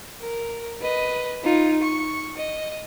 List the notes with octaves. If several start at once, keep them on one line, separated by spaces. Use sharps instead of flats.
A#4
B4 D#5
D#4 F4
C#6
D#5